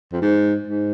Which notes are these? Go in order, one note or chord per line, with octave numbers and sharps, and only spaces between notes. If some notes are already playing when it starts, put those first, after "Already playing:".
F2
G#2
G#2